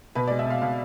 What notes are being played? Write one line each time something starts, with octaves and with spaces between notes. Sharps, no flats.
B2 B4
G#3 D5
E5
B2 F5
B2 F5